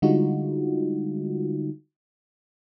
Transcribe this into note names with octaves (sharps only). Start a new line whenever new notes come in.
D3 G3 G#3 D#4 F4 F#4